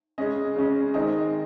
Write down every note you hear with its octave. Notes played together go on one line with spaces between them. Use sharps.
C#3 G#3 C#4 D#5
C#3 G#3 C#4
D#3 G#3 C4 D#5